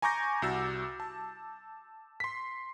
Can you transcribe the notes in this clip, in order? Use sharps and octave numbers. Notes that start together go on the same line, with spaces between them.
G#5 A#5 C#6 D6 G6 A#6
C2 F#4 E6 A6
A5
C6 B6